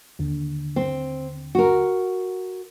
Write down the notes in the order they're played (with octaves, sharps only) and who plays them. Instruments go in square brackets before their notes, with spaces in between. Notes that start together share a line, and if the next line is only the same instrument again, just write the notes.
[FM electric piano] D#2 D3
[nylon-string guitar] C4
F#4 A#4